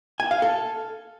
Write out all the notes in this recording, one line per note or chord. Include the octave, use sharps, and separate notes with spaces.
G#5
F5
A4